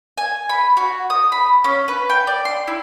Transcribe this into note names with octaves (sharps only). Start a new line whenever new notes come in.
G#5
B5
F#4
D#6
B5
C#4
B4
G5
D5
C6
E4